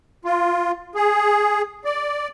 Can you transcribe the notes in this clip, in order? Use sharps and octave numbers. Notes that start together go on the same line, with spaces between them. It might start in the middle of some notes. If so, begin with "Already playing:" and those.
F4
G#4
D5